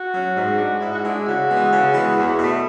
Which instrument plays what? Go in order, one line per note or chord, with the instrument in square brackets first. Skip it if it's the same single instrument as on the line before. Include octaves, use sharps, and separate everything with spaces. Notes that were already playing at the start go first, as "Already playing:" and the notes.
Already playing: [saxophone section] F#4
F#3 C#4
G#2
G#3 D4
G#2 E4
F#4
G#3 D4 E4
C#3 F#4
E3 G#3 B3
C#3
E3 G#3 B3
E2
B2 A3